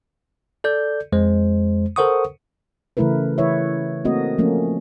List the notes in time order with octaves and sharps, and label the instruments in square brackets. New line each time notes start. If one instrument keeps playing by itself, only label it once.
[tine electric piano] A4 D5 G6
F2 G#3 C5
A4 A#4 C5 F#5 C#6 D#6
[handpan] C#3 E3 A3 E4 A#4 B4
E3 E4 B4 C#5 E5
A3 A#3 C4 F#4 A#4 D#5
F3 A3 A#3 C#4